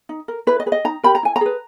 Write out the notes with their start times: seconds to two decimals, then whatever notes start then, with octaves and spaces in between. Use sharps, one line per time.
0.09 D#4
0.28 A#4
0.47 E4 B4
0.60 D#5
0.66 G#4 B4
0.72 D#5
0.84 D#4 A#5
1.03 G4 A#4 B5
1.15 A#5
1.23 E4 G#5
1.36 A#5
1.41 G#4 B4